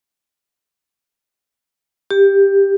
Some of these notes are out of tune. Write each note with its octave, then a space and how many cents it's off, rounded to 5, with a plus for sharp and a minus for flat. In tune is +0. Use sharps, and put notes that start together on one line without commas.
G4 +10